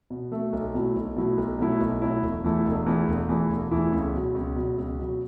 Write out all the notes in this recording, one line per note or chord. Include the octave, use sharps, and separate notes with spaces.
B2
A3 F#4 A4 E5
B1
B2 F#3 A3 E4
B1
B2 F#3 A3 E4
B1
B2 F#3 A3 E4
B1
B2 F#3 A3 E4
E1
E2 E3 A3 E4
E1
E2 E3 A3 E4
E1
E2 E3 A3 E4
E1
E2 E3 A3 E4
C#2
B2 F#3
C#2
B2 F#3
C#2
B2 F#3